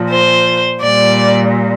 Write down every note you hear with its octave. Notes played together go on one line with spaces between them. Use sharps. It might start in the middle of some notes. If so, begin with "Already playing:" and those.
Already playing: A#2 F3
C5
A#2 G3 D5